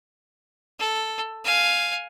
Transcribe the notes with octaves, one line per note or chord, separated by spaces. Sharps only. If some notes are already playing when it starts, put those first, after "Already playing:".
A4
F5 G#5